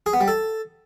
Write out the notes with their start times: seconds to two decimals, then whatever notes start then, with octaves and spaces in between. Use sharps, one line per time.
0.06 G#4
0.13 B3
0.21 G3
0.28 A4